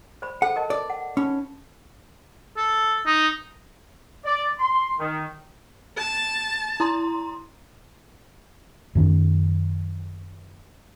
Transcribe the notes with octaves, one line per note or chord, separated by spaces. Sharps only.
C5 D5 B5
A4 C5 F#5
A#4 D#5 A5
D5
F#5
C#4 D#4 B5
A4
D#4
D5
C6
D#3
A5
E4 A#5 C6
F#2 D#3 C#4